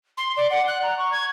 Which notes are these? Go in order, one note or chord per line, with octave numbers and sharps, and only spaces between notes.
C6
D5
F#5
F#6
A#5
C#6
G#6